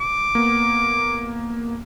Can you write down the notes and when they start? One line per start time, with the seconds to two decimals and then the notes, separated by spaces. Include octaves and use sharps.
0.01 D6
0.35 A#3 B3